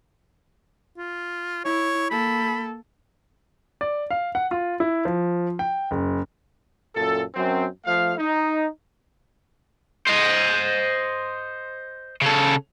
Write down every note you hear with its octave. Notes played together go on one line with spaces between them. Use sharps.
F4
E4 C#5
A#3 A4 B5
D5
F5
F#5
F4
E4
F3
G5
F#1
F#2 A#2 A4
F#2 C4
F3 A3 F5
D#4
C5 D#5
C#3 A4